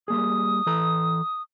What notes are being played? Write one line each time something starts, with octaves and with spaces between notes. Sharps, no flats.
G3 A#3 G#4 D#6
E3 A4 A#5